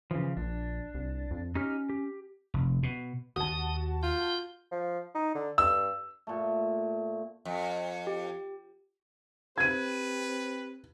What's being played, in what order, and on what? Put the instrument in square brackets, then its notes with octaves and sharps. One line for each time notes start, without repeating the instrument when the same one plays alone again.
[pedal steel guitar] C#3 F3 [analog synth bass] E3
[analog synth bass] A#1 [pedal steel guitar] D4
[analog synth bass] C2
F2
[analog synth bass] C#4 [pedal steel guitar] D#4 G4 F6
[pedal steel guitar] G4
[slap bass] F1
B2
[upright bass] D#2 [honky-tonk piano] F#4 A5 [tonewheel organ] D#6
[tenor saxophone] F4 [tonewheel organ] G6
[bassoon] F3
D#4
D3
[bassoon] G2 [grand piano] E6
[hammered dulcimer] A#2 A3
[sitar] F2
[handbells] G4
[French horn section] C4 G4 [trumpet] B4 [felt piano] G#6 D#7